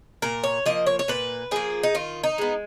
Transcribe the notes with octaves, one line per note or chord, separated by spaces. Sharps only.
A#2 A#4
C#5
F3 A#3 D#5
C#5
C#5
A#2 B4
F3 A#3 G#4
D#4
D#3 F4
D#4
G#3 B3